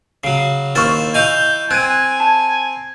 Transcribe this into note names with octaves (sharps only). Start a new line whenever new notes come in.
C#3 F#3 C7
D#2 E4 C5 C#6 F6 A6
E4 D#5 F5 G#5 C#6 G6
C4 G#5 F#6 G#6 D#7
A5